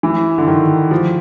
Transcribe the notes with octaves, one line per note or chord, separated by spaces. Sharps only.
E3
D3
D#3
F3